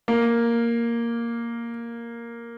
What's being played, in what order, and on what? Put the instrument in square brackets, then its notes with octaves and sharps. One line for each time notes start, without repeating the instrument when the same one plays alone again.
[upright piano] A#3